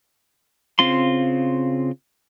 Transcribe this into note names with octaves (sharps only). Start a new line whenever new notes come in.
C#3 C4 F4 C6